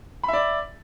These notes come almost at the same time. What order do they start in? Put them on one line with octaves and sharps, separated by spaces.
B5 E5 D5